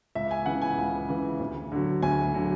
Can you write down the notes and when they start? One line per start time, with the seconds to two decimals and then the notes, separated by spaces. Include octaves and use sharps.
0.15 C#2 E5
0.31 G#5
0.46 C#3 E3 F#5
0.62 G#5
0.78 C#2
1.09 C#3 E3
1.40 D2
1.72 D3 F#3
2.02 D2 G#5
2.34 D3 F#3